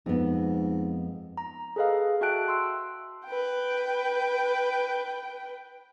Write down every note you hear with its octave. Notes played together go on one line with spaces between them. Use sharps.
F2 G#2 B3
A#5
G#4 A4 B4 D#5 F5
F#4 E5 G5 A5 F#6 D7
C6 E6
B4 G5